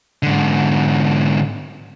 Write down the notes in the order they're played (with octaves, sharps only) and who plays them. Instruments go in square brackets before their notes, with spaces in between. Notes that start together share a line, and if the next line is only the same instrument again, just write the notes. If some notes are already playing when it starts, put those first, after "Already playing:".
[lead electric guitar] G#2 D3